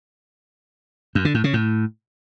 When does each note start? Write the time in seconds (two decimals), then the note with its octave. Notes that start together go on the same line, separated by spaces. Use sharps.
1.15 F#2
1.25 D3
1.34 A2
1.44 C#3
1.54 A2